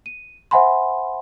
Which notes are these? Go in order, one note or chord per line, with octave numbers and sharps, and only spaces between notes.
D#7
C5 E5 F#5 G#5 B5 C6